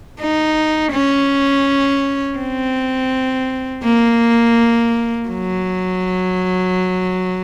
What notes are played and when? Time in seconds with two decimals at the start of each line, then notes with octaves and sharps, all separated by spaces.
0.20 D#4
0.92 C#4
2.38 C4
3.84 A#3
5.29 F#3